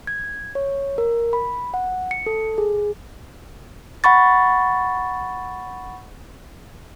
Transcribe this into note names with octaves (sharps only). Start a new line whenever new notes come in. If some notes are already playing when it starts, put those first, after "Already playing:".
G#6
C#5
A#4
B5
F#5
C#7
A4
G#4
F#5 B5 C#6 A6